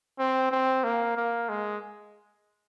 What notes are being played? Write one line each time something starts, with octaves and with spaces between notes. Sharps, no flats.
C4
C4
A#3
A#3
G#3